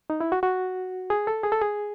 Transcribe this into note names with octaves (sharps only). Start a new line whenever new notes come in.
D#4
E4
F#4
F#4
G#4
A4
G#4
A4
G#4